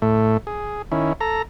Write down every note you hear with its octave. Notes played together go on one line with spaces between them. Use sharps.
A2 A3
G#4
D#3 C#4 E4
A4 A#5